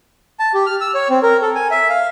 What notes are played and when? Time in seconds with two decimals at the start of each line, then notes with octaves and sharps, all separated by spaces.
0.40 A5
0.54 G4
0.66 F6
0.81 E6
0.94 C#5
1.10 C4
1.23 A#4
1.42 A4
1.55 G#5
1.71 E5
1.89 F5